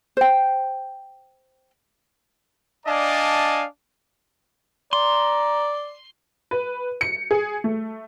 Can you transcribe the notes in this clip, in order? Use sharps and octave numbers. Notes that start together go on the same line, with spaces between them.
C5 G5
D4 D5 D#5 F5 G#5 A5
D5 A#5 C6
B4
C#7
G#4
A3